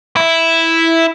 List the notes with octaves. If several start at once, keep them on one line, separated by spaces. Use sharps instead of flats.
E4